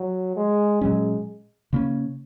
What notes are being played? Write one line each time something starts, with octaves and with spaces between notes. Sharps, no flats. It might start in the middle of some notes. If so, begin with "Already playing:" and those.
Already playing: F#3
G#3
A#2 F#3 G#3 C#4
C#3 A#3 C#4